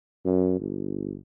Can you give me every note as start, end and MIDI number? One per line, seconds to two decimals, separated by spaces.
0.25 0.55 42
0.59 1.18 31